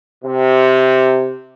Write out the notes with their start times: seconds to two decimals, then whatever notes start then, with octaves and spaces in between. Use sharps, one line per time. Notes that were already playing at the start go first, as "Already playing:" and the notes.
0.24 C3